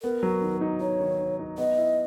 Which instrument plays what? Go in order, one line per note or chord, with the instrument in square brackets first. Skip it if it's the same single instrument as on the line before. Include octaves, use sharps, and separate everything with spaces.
[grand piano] B3 [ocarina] A#4
[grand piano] F#3
D#3
D#4
[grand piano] D#4 [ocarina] C#5
[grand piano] D#3
D#3
D#4
[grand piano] B3 [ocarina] D#5
[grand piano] E4